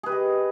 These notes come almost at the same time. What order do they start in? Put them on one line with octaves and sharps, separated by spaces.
G#4 B4 G4 D#5